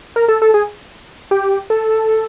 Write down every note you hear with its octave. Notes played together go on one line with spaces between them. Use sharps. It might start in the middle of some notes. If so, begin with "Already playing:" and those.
A#4
A4
A4
G#4
G4
A4